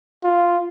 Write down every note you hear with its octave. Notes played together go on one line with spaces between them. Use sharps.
F4